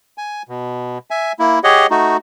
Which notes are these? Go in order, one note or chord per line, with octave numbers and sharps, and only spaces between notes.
G#5
B2
E5 G#5
A#3 E4
G4 G#4 C#5 D#5 F#5
A3 D#4 F#4